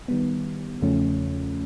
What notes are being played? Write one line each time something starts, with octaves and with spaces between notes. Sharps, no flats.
D#3 G3 B3
E2 C#3 F3 A3 C#4